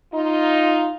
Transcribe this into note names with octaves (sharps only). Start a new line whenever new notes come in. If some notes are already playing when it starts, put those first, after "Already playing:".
D#4 F4